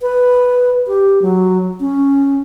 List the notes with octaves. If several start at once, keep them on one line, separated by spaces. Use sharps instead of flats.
B4
G4
F#3
C#4